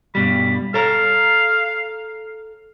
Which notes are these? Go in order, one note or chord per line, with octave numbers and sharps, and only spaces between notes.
G2 B2 G3 B5
A4 C#5 F5 A#5